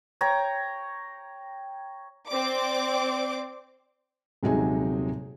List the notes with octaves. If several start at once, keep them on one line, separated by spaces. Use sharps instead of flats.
C#5 G5 A#5
C4 D5 D6
D#1 C3 F#3 G#3 D#4 G#5